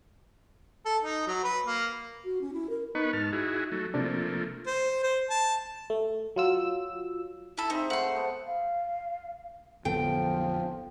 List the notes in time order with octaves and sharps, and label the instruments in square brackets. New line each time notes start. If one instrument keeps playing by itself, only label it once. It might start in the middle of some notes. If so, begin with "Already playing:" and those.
[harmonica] A4
D#4
F#3
B4
A#3
[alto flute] F#4
C#4
E4
A#4
[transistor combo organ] B3 B4 C#6 [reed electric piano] D#4
[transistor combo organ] G#2 A5 F6
E4 F#4 G#4
F#3 A3
[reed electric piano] C3 D4 [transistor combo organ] F3 A3 A#3
[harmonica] C5
C5
A5
[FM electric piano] A3
F#3 F4 E6
[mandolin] E4 A4
[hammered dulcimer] C4 G#4 E5 [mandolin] D#4
[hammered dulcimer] A3 F5 C#6 [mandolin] F#5 C6
[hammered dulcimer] A4 B4 C5
B3
[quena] F5
[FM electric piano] A1 B3 A4 [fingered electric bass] F2 D3 F#3 [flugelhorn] F3 [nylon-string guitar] G5